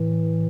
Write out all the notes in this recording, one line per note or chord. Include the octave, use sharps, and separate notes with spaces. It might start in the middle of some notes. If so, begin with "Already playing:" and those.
Already playing: A2 E3